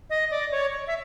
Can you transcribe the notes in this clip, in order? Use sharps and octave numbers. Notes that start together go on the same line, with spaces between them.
D#5
D5
C#5
E5